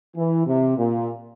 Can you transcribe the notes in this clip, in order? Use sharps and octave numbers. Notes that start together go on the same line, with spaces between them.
E3
C3
A#2